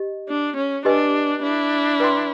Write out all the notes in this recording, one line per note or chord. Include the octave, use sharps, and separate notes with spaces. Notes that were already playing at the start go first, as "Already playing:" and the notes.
Already playing: G4 D#5
D4
C#4
D4 G4 B4 D#5 G#5
D4 E4
B4 D5 G5 C6